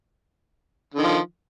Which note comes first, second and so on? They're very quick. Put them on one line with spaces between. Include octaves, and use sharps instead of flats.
D3 D#3 F3